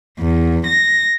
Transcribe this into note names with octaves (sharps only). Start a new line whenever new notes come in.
E2
A#6